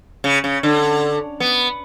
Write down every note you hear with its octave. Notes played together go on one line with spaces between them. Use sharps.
C#3
C#3
D3
B3